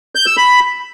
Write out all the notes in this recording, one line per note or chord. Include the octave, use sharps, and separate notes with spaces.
G6
E6
B5